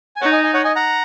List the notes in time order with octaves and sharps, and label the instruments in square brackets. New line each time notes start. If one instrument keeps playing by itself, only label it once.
[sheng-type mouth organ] G#5
[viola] D#4 [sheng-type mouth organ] C#5 F#5
[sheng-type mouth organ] D#5 G#5
D#5 G#5
C#5 F#5
D#5 G#5
F#5 A#5